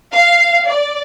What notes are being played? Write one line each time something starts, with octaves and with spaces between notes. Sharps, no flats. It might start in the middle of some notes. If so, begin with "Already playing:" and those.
F5
D5